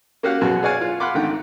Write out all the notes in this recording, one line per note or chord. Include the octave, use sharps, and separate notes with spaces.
A#3 C#4 F#4 G4 F5 F#5
F#2 B2 F#4 G#4
G#4 C#5 D5 F5 F#5 G#5
F4
F5 F#5 B5 C6 D6
G#1 D3 D#3 A3 F#5 G5